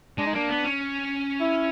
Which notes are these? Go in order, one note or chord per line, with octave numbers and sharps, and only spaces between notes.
G#3 D4
D#4
A#3 D4
B3
C#4
E4